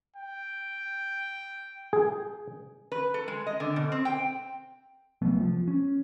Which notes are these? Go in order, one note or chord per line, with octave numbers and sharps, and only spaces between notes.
G5
G#4
B4
A4
G#3
D#5
D3
B2
C4
G5
C2 F#3 A3 B3
F3
C#4